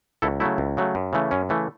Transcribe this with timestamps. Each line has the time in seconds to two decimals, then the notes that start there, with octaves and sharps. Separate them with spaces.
0.22 C#2 E4 A4
0.40 C#3 F#3 A3 E4
0.58 C#2
0.77 C#3 F#3 A3
0.95 F#2
1.13 C#3 E3 A3
1.31 F#2 C#4
1.49 C#3 E3 A3